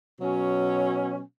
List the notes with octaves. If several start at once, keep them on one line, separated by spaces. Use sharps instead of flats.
B2 F#3 C#4